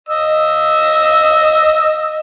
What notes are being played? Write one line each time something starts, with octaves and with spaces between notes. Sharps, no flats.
D#5 E6